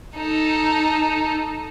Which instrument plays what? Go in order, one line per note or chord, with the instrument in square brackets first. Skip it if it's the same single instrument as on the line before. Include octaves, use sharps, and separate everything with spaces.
[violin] D#4 A4